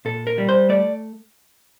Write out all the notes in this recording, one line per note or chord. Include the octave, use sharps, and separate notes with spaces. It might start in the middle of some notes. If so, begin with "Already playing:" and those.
A#2 A4
A#4
G3
C5
A3 D5